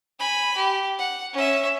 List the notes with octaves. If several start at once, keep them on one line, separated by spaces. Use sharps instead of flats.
G#5 B5
G4
F#5
C#4 E5